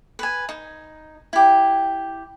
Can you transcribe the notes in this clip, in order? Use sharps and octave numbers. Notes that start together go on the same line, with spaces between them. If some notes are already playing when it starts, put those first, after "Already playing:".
B4 G#5
D#4
E4 G4